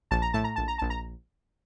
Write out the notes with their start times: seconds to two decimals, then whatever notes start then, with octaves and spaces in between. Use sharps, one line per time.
0.11 A#1 A5
0.22 A#5
0.33 A2 A5
0.44 A#5
0.56 A#1 A5
0.68 A#5
0.78 A#1 A5
0.90 A#5